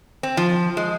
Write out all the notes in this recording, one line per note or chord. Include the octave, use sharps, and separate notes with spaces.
C4
F3
G#3